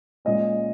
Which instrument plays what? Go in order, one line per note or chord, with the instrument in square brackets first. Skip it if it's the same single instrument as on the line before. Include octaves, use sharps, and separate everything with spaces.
[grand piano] A#2 G#3 C#4 D#5